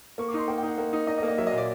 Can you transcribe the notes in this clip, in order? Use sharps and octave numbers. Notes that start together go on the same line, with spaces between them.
A#3 C#6
D6
D#4 C6
A#3 G5
G5
D#4 F#5
A#3
D#4
D#4 D#5
D#5
A#3
D#5
F#3 E5
D#5
A#2
D5